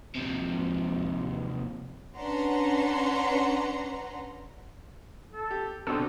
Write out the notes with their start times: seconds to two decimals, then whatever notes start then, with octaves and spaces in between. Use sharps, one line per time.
0.15 D#2 G#2 C3 F3
2.16 C#4 D4 B4 F#5 A#5 C6
5.33 A4
5.51 G4
5.87 C2 B2 D3 D4 A4 C5